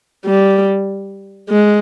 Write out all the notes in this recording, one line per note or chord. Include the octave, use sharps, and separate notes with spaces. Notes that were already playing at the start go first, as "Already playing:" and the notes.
G3
G#3